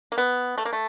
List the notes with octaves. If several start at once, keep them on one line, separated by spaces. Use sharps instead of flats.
A#3
B3
A3
A#3
A3